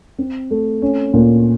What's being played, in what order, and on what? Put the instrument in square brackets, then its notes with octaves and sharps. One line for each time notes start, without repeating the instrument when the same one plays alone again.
[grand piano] C4
A3
C#4
A#2